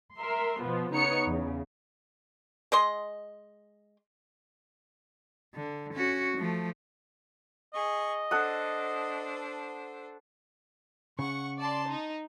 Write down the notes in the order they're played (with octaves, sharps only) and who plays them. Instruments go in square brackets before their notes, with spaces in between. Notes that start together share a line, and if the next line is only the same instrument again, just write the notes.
[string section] A#4 E5 C6
B2 F3 B3
C#3 B3 D#4 C#5 C#7
E2 C#3
[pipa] G#3 D#5 C6
[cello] D3
C#4 F#4
F3 A3
[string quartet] G#4 C#6 [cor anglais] D#5
[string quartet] D4 C5 [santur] A4 F#5 D#6
[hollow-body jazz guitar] C#3 [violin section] F#5 C#6
[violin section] D5 A5 C6
D#4